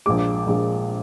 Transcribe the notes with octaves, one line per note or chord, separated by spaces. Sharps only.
A#1 A#2 G#3 D6
A#1 A#2 G#3